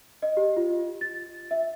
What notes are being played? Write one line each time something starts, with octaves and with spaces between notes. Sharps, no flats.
D#5
G4
F4
A6
E5